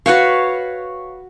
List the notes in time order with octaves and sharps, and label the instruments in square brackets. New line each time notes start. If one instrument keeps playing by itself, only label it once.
[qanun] F#4 B4 C#5 F5